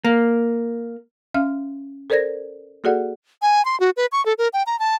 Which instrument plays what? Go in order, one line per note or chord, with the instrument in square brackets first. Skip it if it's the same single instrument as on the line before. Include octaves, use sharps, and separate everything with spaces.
[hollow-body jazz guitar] A#3
[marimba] C#4 E5 F5 F6
A4 A#4 C5 D5 G#6 A#6
A#3 F#4 G#4 A4 D5 F#5
[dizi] G#5
C6
F#4
B4
C#6
A4
A#4
G5
A#5
A5